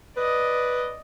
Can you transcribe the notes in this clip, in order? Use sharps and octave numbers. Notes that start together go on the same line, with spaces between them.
B4 D5 D#5